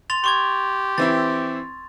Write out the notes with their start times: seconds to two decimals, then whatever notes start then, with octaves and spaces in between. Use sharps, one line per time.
0.10 C6 A6 F7
0.24 G4 C6 C#6 G#6
0.98 E3 C4 E4 A6